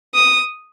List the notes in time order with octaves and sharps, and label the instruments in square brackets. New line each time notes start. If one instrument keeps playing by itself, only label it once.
[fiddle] D#6